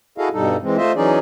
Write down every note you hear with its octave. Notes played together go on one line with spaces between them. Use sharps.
E4 F#4 G#4 A4 D#5 F5
G2 B2 G3 D#4 A4
E3 G#3 C4
A3 F4 C5 D#5 E5
E3 F#3 C#4 D#4 G#4 D5